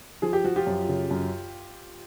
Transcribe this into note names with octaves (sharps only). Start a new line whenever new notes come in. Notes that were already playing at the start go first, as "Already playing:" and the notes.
F3 G#4
G4
F3 F#4
F4 G4
F#2
C#3
F#2